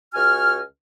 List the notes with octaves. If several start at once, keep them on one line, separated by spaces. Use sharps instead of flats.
C#2 F#4 G#5 F6